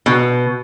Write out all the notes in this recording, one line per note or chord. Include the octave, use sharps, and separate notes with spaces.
B2